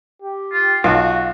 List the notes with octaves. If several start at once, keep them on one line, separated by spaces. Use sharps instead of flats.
G4
F4
B1 F4 F#4 F#5